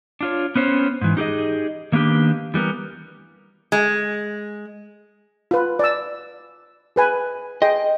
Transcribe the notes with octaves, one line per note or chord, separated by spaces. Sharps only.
D4 F4 C#5
B3 C#4 C5 C#5
G#2 E3
D#4 G4 G#4 D#5
D#3 A#3 B3 D4 G4
E3 G3 B3 A#4
G#3
F4 B4
D5 E6
G#4 B4 G#5
G#4 D#5 G5 C6